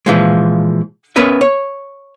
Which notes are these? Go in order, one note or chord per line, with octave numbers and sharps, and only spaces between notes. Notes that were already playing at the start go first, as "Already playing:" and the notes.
A#2 E3 F3 G#3
B3 C#4 A#4 B4 E5
C#5